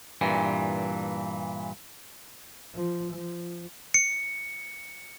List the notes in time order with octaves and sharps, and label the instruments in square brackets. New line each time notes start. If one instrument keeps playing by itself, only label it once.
[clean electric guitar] G2 A#2 E3
[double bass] F3
F3
[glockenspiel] C#7